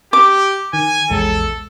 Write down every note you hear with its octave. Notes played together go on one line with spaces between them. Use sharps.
G4 D6
D#3 G#5
A#1 E2 G#3 A4